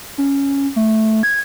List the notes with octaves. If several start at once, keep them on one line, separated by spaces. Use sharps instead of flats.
C#4
A3
G#6